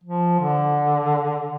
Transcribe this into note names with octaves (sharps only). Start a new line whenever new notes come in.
F3
D3